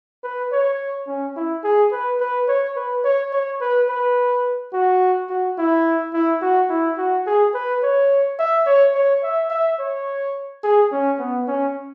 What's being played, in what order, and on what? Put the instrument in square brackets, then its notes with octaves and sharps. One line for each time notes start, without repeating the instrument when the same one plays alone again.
[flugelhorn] B4
C#5
C#4
E4
G#4
B4
B4
C#5
B4
C#5
C#5
B4
B4
F#4
F#4
E4
E4
F#4
E4
F#4
G#4
B4
C#5
E5
C#5
C#5
E5
E5
C#5
G#4
C#4
B3
C#4